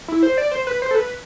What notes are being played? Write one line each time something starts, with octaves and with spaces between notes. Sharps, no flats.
E4
C5
D5
C5
B4
C5
A4
B4